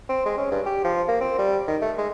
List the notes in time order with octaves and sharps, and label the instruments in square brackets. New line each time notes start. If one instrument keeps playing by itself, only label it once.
[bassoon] C4
G#3
C#4
G2
G4
F3
A#3
C4
G3
D#3
A3
G#3